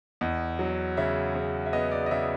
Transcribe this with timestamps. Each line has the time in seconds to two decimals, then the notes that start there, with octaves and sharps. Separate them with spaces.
0.21 E2 D#5
0.59 F#3
0.97 C#3 E5
1.35 C#3
1.66 E5
1.73 B3 D#5
1.91 D5
2.06 D#5
2.11 C#3 E5